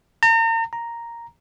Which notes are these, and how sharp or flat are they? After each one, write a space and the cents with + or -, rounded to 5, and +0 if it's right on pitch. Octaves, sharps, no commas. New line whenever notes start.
A#5 -40
A#5 +0